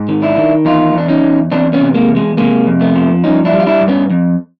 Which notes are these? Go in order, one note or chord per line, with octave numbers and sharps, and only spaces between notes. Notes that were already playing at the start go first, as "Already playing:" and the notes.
Already playing: G#2
D#3
D4 E4
D#3
E2 D#4 F4
E2 D4
C#4 D#4
E2
E2 C4 D4
B3 C#4
C3
G#3 A#3
E2
G#3
C3 G#3 A#3
F2
A3 B3
F3
G2 C#4 D#4
D4 E4
G3
F4
D4 E4
G2
B3 C#4
F2